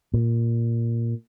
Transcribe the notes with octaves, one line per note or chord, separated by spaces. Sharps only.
A#2